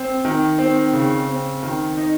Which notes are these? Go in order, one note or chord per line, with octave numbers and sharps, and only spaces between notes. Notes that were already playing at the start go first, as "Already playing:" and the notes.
Already playing: C4
D#3
C4
C#3
C4
D#3
D#4